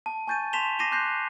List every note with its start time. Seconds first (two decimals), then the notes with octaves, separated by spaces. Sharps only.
0.06 A5
0.27 G#5 C#6 G6 A6 D#7
0.53 A5 C6 B6 E7 F7 G7
0.79 D6 A#6 C7 D#7 E7 G7
0.91 C6 D6 F#6 G6 A#6 C7